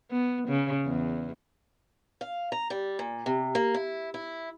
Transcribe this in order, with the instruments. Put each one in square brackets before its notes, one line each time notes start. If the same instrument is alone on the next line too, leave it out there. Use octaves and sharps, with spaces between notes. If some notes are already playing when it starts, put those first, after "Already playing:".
[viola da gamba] B3
C#3
E2
[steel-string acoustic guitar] F5
A#5
G3
A#2
C3
A#3
E4
E4